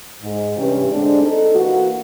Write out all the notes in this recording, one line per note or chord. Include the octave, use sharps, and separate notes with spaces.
G#2
G2 C3 E3 C#4 G4
D3 G#3 C4 D4
D#4 A4
E3 A#3 F#4